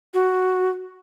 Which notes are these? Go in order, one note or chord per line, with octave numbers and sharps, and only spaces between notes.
F#4